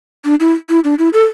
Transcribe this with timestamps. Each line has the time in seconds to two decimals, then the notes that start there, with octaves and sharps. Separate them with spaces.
0.25 D4
0.40 E4
0.69 E4
0.84 D4
0.99 E4
1.13 A4